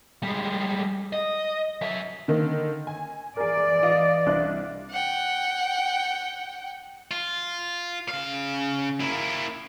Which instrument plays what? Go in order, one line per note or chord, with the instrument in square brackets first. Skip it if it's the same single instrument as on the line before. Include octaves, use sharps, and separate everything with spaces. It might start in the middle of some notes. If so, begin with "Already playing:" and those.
[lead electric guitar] G3 G#3
D#5
F#3 E5
[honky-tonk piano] D3 D#3 A#3
G#5
[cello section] E3 D5 [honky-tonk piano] G#4 A#4
[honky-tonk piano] F4 D#5 F5
C2 D4 F#6
[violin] F#5 G5
[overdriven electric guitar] F4
C#3 F5
A#3 E4